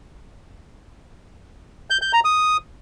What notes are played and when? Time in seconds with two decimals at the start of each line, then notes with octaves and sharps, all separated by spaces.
1.90 G6
2.02 G6
2.13 A#5
2.25 D#6